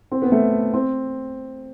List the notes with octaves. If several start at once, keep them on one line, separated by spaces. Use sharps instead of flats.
C4
B3
A3
C4